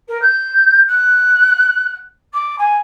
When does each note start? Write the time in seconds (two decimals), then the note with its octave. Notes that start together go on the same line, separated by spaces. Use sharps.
0.08 A#4
0.22 G6
0.87 F#6
2.33 D6
2.58 G#5